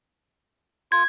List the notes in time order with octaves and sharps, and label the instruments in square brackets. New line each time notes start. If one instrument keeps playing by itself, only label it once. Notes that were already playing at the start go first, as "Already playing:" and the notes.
[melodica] F4 [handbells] G#6